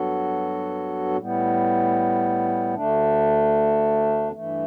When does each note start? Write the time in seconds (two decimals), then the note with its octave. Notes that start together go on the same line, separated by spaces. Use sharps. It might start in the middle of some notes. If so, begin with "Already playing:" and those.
Already playing: G2 F#3 B3 F#4 A4
1.17 A2 G3 B3
2.75 D2 D3 A3 D4
4.32 G2 E3 A3